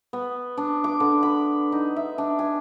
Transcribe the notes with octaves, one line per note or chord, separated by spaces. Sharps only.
B3
D4
D6
D3
B5
D#4
E5
D4
G#5